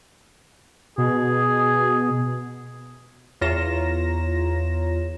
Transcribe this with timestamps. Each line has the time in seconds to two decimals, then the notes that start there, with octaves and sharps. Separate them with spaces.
0.98 B2 G#4
3.41 E2 F4 C#5 A#5 A#6 E7